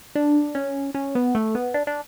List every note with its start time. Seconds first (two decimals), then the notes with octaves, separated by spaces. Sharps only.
0.15 D4
0.55 C#4
0.95 C#4
1.15 B3
1.35 A3
1.55 B3
1.74 D4
1.87 D4